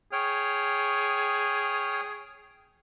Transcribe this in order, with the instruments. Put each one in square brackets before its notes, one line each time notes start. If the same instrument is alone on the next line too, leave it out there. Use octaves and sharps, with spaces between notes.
[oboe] G#4 [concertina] C#5 G5 F6